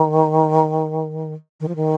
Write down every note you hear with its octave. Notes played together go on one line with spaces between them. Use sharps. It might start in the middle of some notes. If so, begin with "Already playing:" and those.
Already playing: D#3
D#3
F3
D#3